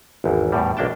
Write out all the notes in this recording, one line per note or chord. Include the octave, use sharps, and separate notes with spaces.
G#1 E2
E2 A2 G3
B1 A#3 D4 G5 A5